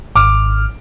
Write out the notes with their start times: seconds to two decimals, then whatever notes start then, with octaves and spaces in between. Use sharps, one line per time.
0.16 G#1 D6 F6